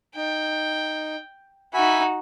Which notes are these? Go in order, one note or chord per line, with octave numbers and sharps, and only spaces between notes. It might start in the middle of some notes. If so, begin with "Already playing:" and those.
D#4 G5
D#4 F#4 E5 G#5 B5